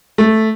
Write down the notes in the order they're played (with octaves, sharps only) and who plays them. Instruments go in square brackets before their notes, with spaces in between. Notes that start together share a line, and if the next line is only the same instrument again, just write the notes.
[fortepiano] A3